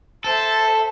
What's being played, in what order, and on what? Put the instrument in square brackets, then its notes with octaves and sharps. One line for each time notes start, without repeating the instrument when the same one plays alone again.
[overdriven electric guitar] A4 [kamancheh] C5 E5